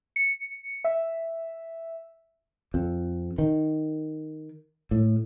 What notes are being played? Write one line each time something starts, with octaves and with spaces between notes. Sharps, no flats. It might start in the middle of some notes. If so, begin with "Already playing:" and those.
C#7
E5
F2
D#3
A2